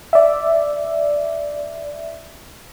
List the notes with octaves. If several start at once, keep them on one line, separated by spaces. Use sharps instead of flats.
D5 E5